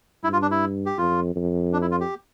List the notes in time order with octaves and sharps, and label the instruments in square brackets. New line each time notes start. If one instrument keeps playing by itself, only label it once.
[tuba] G2 [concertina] E4
[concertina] F4
D4
E4
G4
[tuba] F2 [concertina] F4
[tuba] F2
[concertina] D4
E4
F4
G4